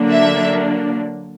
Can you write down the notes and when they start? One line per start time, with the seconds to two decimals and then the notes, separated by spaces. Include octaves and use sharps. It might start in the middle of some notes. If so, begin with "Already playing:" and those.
Already playing: D3 F#3 A#3 D4
0.11 E5